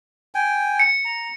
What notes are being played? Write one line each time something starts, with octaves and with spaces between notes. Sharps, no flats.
G5 G#5
C#7
A#5